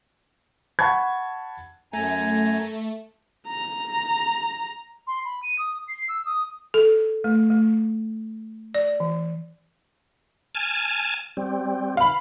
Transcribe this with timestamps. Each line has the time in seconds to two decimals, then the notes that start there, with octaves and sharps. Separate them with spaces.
0.79 F#5 A5 B5 C#6 G#6
1.93 F#2 A3 G#5 A#5
3.48 A#5
5.07 C6
5.25 B5
5.43 D#7
5.58 D#6
5.88 C7
6.08 E6
6.26 D#6
6.74 A4
7.24 A3
7.50 A3
8.74 D5
9.00 E3
10.55 G#5 A5 F6
11.37 G3 C4
11.97 F5 B5